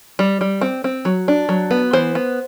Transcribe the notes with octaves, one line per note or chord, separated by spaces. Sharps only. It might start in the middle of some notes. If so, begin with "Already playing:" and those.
G3
G3
C4
C4
F#3
D4
F#3
B3
E3 C5
B3